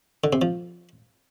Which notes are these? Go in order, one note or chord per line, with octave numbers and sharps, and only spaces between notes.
D3
C3
F3